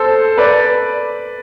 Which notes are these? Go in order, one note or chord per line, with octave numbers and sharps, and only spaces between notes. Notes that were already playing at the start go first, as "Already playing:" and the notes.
Already playing: A4 C5
B4 D5